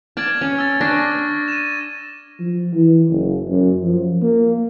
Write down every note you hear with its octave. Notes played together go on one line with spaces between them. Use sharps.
D5 A5 F6 G#6
C#4
E6 A6
D4 C#6 A#6
D#7 E7
F3
E3
F#1
F#2
F3
A#3